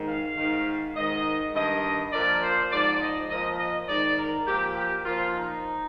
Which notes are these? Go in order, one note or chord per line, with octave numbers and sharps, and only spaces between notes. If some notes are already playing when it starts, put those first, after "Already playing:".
Already playing: G#2 D#3
F5
G#2 D#3
G#2 D#3 D#5
G2 D#3 D#5
A#2 F3 D5
C5
G#2 F3 D5
D#5
A#2 F3 D#5
D#5
G#2 D#3 D5
A#4
A#2 F3 G4
G4
A#2 F3 F4
D#4